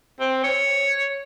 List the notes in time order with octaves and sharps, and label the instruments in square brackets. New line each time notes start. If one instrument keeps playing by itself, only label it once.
[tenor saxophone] C4
C#5